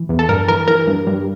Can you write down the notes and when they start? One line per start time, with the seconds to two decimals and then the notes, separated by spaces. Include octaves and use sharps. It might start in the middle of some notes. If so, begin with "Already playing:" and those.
Already playing: E3
0.09 E2
0.19 A4
0.29 G2 A#4
0.48 E3 A#4
0.68 E3 A#4
0.87 G2
1.07 G2